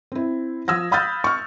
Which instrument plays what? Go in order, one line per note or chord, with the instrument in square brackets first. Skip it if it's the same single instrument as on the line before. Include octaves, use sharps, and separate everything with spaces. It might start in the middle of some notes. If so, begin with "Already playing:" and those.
[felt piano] C4 E4
F3 D#6 E6 G#6 A#6
F5 B5 D#6 F6 G6 A6
C#6 F6